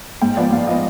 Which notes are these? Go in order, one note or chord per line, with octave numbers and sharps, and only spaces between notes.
G#2 G5
F3 B3 D5
G#2 F5
F3 B3 D#5